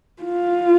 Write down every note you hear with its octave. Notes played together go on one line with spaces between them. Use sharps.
F4